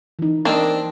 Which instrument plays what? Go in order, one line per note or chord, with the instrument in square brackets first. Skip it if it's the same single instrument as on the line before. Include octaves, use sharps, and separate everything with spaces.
[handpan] E3 D#4
[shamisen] A#3 [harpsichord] C4 D4 [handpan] A#4 D#5